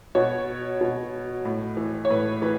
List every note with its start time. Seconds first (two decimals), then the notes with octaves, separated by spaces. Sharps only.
0.15 B2 C#5
0.81 B2
1.45 A2
1.77 E3
2.05 C#5
2.10 A2 B4
2.42 E3 B4